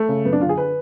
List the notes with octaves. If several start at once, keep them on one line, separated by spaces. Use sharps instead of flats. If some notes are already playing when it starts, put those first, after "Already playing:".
Already playing: A3
C#3
F#2 B3
D4
D3 F4
G#4
B4